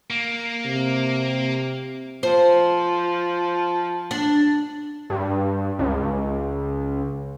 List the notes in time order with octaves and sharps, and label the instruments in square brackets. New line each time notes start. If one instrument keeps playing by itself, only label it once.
[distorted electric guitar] A#3
[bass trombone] C3
[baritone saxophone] F3 [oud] C5
[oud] D4
[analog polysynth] G2
C#2